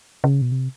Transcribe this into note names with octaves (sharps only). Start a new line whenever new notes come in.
C#3
B2
C3